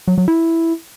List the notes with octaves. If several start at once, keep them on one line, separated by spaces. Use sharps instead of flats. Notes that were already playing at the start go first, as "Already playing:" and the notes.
F#3
F#3
E4